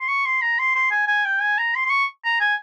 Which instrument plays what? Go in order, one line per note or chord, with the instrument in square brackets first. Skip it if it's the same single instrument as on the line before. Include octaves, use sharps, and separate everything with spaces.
[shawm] C6
C#6
C6
A#5
C6
C6
G#5
G#5
G5
G#5
A#5
C6
C6
C#6
A#5
G#5